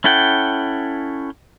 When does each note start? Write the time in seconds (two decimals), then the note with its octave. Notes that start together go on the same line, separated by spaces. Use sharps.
0.04 C#4 E4 A4 F#5 G5